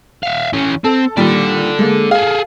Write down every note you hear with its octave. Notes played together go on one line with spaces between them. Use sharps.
E5 F5
E3 C#4
C4 A4
A#2 D#3 G3 A4 D5
G#3 A#3
G#4 A4 F5